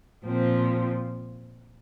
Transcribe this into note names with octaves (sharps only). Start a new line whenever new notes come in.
A#2 F3 C4